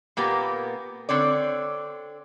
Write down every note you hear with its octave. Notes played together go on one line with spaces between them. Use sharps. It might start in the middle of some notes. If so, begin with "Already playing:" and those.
A#2 A#3 B3 G4
D3 C4 C#5 D5